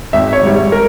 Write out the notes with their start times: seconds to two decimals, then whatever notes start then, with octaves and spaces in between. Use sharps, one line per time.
0.13 G#1 E5
0.33 C#5
0.43 G#2 G3
0.72 A#4